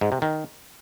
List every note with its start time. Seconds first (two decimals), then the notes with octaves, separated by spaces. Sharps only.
0.01 G#2
0.12 C3
0.22 D#3